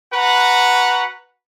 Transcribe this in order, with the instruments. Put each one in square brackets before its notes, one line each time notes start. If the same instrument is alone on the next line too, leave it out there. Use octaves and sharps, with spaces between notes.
[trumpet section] F#4 B4 F#5 A#5